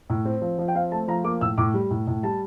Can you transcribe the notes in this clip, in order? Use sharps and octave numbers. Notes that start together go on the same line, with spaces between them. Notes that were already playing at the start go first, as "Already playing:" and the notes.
A2
C4
F3
F3
G5
C4 F5
A3 A5
F3 A#5
A#3 D6
A2 E6
A2 D6
G3
A2
A2
G3 A5